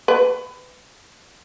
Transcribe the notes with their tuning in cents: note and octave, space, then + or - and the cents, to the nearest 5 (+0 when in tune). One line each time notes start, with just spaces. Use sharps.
B4 +30